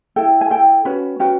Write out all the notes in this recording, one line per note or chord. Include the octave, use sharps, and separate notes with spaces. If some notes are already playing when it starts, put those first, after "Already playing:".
E4 A4 G5
G#5
E4 A4 G5
C#4 F#4 B4
C#4 F#4 B4 G5